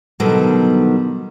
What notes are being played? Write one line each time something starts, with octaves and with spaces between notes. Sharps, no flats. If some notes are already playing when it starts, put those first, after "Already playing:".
B2 D3 D#3 F#3 G3